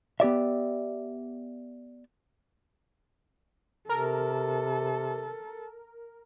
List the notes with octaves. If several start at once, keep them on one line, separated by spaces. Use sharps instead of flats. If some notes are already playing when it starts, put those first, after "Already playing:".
B3 G4 D5 E5
C3 A4 A#4